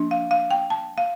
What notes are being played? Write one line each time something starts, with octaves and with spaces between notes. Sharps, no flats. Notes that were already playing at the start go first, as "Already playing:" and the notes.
Already playing: F3 A#3 D4
F5
F5
G5
A5
F5